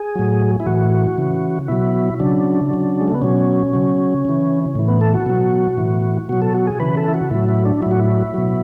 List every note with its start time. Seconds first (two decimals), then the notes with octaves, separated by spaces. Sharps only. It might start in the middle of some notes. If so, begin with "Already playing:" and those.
Already playing: G#4
0.15 A2 F#3
0.60 E4
0.66 A2 E3 F#4
1.18 C#3 E3
1.68 B2 F#3 E4
2.20 C#3 F#3 D4
2.71 C#3 F#3
3.01 G#3
3.08 A3
3.15 B3
3.22 B2 F#3 C#4
3.73 C#3 F#3
4.25 C#3 E3
4.75 A2 E3
4.88 B3
5.01 A4
5.14 F#4
5.26 B2 F#3
5.78 A2 E3
6.29 B2 F#3 F#4
6.42 A4
6.55 F#4
6.67 G#4
6.80 C#3 E3 B4
6.97 A4
7.08 E4
7.14 F#4
7.31 A2 F#3 E4
7.49 E4
7.65 D4
7.82 A2 F#3 E4
7.91 F#4
8.00 E4
8.34 B2 F#3